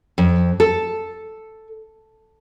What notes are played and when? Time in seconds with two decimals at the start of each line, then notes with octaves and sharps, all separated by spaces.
0.18 F2
0.60 A4